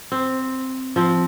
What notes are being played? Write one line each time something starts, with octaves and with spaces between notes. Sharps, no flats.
C4
F3 C4